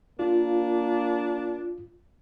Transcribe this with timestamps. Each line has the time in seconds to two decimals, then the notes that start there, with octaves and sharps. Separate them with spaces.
0.19 A#3 D4 F4